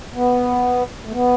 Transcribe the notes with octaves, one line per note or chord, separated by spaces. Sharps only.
B3
A3
B3